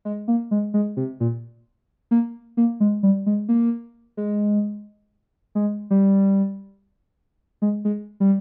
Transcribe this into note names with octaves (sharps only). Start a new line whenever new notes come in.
G#3
A#3
G#3
G#3
C3
A#2
A#3
A#3
G#3
G3
G#3
A#3
G#3
G#3
G3
G#3
G#3
G3